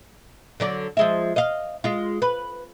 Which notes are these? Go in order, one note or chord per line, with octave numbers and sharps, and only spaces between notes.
D3 F#3 D5
F3 G#3 E5
D#5 F5
G#3 F4
B4